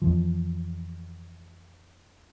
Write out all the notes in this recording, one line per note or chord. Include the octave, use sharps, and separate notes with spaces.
F2 E3 F3